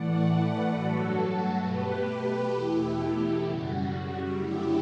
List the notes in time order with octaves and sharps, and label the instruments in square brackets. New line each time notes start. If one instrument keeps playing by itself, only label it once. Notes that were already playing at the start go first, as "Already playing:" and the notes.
Already playing: [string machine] A2 E3 A3 D5 F#5
B4 D5
G2 F#3 A3 F#4 A4
B2 A3 G4 B4
E2 B2 A3 E4 G4
F#2 C#3 G3 F#4
F#2 D3 F#3 A3 E4 G4